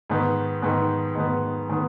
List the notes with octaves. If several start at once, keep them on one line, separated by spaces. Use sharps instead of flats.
G#2 D#3 B3
G#2 D#3 B3
G#2 D#3 B3
D#3 B3